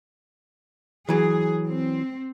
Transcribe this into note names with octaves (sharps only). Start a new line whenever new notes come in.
E3 F#3 G#4
C4